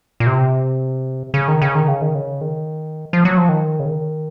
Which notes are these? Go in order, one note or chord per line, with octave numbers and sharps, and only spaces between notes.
A#2
C3
C#3
D#3
C#3
D#3
C#3
D#3
C#3
D#3
F3
F#3
F3
D#3
C#3
D#3